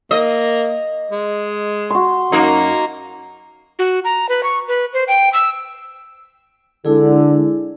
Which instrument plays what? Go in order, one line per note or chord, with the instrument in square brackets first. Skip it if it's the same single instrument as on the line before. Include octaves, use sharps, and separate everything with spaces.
[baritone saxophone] A#3 [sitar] D#5
[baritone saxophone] G#3
[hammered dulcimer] F#4 C6
[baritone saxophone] F#2 [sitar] A#3 D#4
[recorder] F#4
A#5
B4
C#6
B4
C5
G5
E6
[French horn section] D3 [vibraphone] G#3 E4 G#4